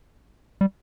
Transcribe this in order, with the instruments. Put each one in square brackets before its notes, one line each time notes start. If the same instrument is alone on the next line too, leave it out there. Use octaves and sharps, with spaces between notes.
[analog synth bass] G3